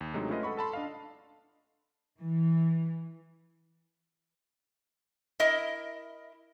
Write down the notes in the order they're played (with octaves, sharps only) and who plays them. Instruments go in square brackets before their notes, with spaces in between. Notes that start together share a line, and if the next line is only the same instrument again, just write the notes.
[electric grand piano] D#2
C3 F#3 G#3 A3 D4 D#4
A3 C#4 E4 F4 B4 D#5
A4 F#5 B5 C#6
A4 A5 B5 C6
D4 D#5 F5
[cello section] E3
[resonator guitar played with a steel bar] E4 A#4 D#5 E5